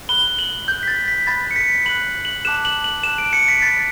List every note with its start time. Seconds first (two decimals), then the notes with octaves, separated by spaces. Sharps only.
0.09 B5 F#6 G7
0.39 F#7
0.67 B5 G6
0.72 F#6
0.83 B6
0.88 A6
1.08 B6
1.27 B5 F#6 A6
1.51 C#7
1.56 B6
1.85 B5 F#7
1.89 F#6
2.25 F#7
2.45 A5 D6 F#6 E7
2.65 F#7
2.84 F#7
3.03 A5 D6 F#6 E7
3.18 D7
3.33 C#7
3.48 B6
3.62 B5 F#6 A6